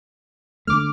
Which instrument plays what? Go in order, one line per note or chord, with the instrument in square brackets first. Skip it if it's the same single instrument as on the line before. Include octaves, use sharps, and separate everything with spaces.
[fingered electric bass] D3 A3 [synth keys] D6 F6